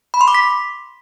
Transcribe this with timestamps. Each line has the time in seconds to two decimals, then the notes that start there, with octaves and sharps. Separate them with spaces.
0.14 B5
0.21 C6
0.28 D6
0.34 B6